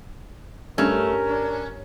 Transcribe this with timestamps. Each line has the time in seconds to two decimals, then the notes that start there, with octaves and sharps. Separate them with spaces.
0.78 G2 A3 C#4 A#4
1.29 D4